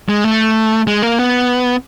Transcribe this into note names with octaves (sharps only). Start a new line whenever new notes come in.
G#3
A3
G#3
A#3
B3